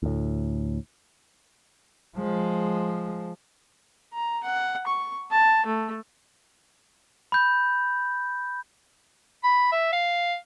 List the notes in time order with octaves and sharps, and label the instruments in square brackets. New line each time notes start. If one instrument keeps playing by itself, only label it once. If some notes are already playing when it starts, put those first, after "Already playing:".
[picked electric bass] D2 A2
[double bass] F3 G#3
[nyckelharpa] A#5
F#5
C#6
A5
A3
[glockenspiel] B5 G6
[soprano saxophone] B5
E5
F5